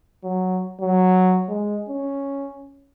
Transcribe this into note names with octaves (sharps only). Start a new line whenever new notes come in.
F#3
F#3
G#3
C#4